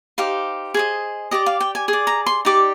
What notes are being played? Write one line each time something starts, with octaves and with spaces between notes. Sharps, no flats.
D#4 G4 C5 F5
G#4 C5 D#5
G4 D5 D#5
F5
G5
G#5
G#4
D5
A#5
C6
D#4 G4 D5 D6